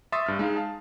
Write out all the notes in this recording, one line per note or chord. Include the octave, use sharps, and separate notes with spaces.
E5 C6 C#6 D#6 A6
G2 F6
G#3 D#4 F5
F5 A5